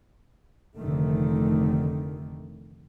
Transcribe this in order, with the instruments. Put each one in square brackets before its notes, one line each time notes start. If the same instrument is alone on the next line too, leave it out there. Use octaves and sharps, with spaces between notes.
[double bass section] F1 D3 D#3 A3